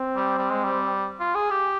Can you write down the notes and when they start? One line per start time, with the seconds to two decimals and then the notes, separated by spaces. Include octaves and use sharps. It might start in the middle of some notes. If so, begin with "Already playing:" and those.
Already playing: C4
0.16 G3
0.38 G3
0.51 G#3
0.64 G3
1.20 F4
1.35 G#4
1.50 G4